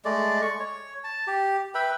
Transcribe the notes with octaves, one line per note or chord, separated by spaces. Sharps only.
G#3 A3 D5
C#6
C#5
A5
G4
B4 E5 G5 B5